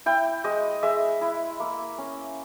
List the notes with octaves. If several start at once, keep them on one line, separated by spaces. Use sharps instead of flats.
E4 G5
G#3 D#5
G#3 E5
E4
A#3
C#4